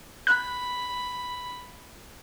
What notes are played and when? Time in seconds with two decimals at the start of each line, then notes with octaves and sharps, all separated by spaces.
0.27 B5 F#6